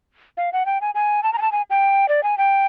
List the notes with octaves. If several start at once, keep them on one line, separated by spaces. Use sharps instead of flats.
F5
F#5
G5
G#5
G#5
A5
A#5
G#5
A5
G#5
G5
D5
G#5
G5